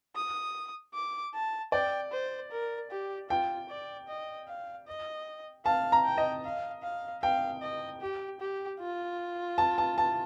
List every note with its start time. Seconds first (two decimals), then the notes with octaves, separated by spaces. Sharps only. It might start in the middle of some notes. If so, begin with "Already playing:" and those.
0.16 D#6
0.94 D6
1.34 A5
1.72 D5 G5
2.12 C5
2.51 A#4
2.90 G4
3.30 F4 G5
3.69 D5
4.08 D#5
4.48 F5
4.87 D#5
5.65 F5 A5
5.92 A#5
6.05 G5
6.18 D#5
6.44 F5
6.83 F5
7.22 F5 G5
7.62 D#5
8.01 G4
8.40 G4
8.79 F4
9.58 A5
9.78 A5
9.98 A5